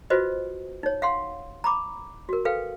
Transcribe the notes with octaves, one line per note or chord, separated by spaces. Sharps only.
F4 F#4 B4 C5 D#5
D#4 C#5
F5 F#5 C6
A#5 B5 D6
F#4 A#4
A4 B4 F5 G5